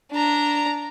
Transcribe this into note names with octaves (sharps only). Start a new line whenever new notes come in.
D4 A#5